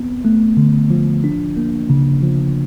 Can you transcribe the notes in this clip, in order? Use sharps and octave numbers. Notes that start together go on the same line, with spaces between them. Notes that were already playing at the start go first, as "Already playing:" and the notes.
Already playing: B3 C4
A3
D3
F3
D4
A#3
C#3
F3